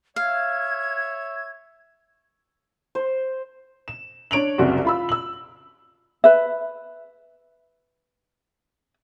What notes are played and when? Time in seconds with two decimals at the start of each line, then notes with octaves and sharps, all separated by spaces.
0.16 C#5 E5 F5 G#6
2.95 C5
3.88 E7
4.31 D4 C#5 D7 F7 F#7
4.58 F#1 C2 F#4
4.85 F4 B5 E6
5.09 E6 F#7
6.24 B4 E5